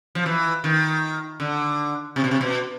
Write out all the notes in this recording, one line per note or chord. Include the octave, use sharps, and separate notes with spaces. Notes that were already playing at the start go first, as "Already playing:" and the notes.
F3
E3
D#3
D3
C3
B2
C3
B2